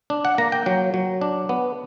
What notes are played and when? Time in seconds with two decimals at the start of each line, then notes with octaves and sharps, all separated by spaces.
0.10 D4
0.25 F#5
0.38 A#3 A#5
0.52 G5
0.66 F#3 G5
0.94 F#3
1.21 D4
1.49 B3